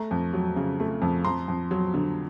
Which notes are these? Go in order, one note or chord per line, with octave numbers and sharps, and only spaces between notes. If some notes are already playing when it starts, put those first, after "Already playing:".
Already playing: A3 A#5
F2
F#3
C#3
A3
F2
F2 A#5 C6
F2
F#3
D3